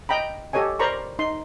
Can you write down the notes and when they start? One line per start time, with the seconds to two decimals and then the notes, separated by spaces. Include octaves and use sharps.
0.09 D#5 G5 A#5 B5
0.53 G4 A4 C#5 D#5 G#5
0.79 A#4 C5 D5 A#5 B5 C#6
1.19 D#4 C6